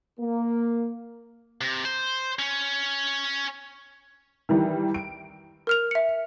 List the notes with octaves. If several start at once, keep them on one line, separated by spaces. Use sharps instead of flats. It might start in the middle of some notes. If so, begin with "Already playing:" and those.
A#3
C3
C5
C#4
D#3 E3 G3
D7
A#4 F6 F7
E5 C#7